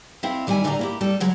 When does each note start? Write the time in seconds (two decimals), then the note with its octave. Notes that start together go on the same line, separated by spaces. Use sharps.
0.23 C4 E4 E5 F5
0.47 D#3 G3 E4 G5 G#5
0.64 A2 D3 D4 G4 D5 A#5
0.79 A#3 E4 G4
1.01 G3 A4
1.20 C#3 F#3 G#3